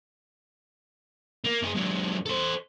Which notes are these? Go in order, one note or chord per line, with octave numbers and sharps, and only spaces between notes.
A#3
F#2 G#4
G#2 F#3
A4 C5